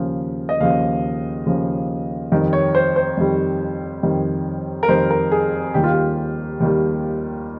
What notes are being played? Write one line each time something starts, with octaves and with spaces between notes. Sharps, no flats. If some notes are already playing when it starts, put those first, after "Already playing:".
Already playing: D#2 C#3 F3
D#5
D#2 C#3 F3 F5
D#2 C#3 F3
F2 D#3 G3
C#5
C5
C5
F2 D#3 G3
F2 D#3 G3
A#4
F2 D#3 G3 C5
A#4
G#4
D#2 D#3 G3 G4
F4
G4
D#2 D#3 G3